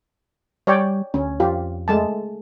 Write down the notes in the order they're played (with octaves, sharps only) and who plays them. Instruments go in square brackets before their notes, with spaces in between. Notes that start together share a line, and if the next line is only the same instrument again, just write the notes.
[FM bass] G3 [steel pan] C#5 D5 G5
[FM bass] D2 [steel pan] C#4
[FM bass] F2 [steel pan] F4 G4
[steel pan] G#3 A3 A5